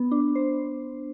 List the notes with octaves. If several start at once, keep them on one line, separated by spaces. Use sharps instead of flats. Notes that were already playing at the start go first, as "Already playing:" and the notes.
Already playing: B3
D4
C5